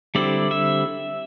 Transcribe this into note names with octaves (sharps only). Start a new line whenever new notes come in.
D3 G3 C4 E4 D5
E5